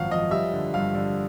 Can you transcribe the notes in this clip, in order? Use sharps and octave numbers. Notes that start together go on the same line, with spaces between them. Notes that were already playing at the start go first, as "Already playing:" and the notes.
Already playing: G#1 F#2 F3 F5 F#5
F3 D#5
G3 E5
D3
G2 F5
D3